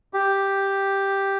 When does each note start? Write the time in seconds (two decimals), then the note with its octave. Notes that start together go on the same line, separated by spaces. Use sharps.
0.13 G4